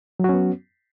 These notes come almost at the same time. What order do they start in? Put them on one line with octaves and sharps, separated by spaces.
F#3 F#4 C#4 B3